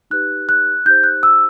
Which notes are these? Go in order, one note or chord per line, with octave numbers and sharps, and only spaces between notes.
D#4 G4 B4 F#6
F#6
D#4 G4 C5 G6
F#6
E6